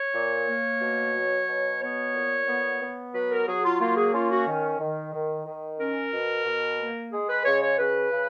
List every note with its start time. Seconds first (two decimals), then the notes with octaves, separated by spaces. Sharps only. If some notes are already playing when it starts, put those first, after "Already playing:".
Already playing: C#5
0.14 A#2
0.48 A#3
0.81 B2
1.14 F#3
1.47 B2
1.80 B3 C#5
2.13 A#2
2.47 B3
2.80 B3
3.13 F#3 B4
3.30 A#4
3.47 F#3 G#4
3.64 F4
3.80 A#3 F4
3.96 G#4
4.13 C#4 F4
4.30 F#4
4.47 D#3
4.79 D#3
5.13 D#3
5.46 D#3
5.79 C#4 A#4
6.13 B2
6.45 B2
6.79 A#3
7.11 G#3 G#4
7.29 B4
7.45 C#3 C#5
7.62 C#5
7.78 C#3 B4
8.12 C#3